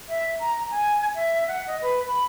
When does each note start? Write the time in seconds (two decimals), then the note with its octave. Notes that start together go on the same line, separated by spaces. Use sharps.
0.09 E5
0.40 A#5
0.71 G#5
1.15 E5
1.48 F#5
1.67 D#5
1.82 B4
2.07 B5